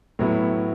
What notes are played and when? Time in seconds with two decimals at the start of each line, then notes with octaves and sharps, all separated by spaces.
0.19 A2 F#3 B3 E4